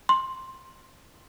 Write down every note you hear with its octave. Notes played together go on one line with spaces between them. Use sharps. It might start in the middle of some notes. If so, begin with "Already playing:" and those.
C6